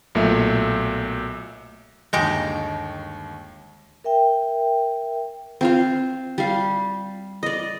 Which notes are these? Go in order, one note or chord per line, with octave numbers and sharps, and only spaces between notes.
B1 A#2 A3 E5
G1 D#2 G#3 D#4 G4
A#4 E5 G5
C4 F4 F5
G3 F5
D5 D#5